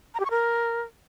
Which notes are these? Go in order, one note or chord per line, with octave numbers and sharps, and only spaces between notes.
A#5
G4
C#6
A#4